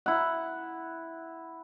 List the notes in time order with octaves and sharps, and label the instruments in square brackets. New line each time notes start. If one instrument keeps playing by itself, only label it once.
[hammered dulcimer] E4 F#5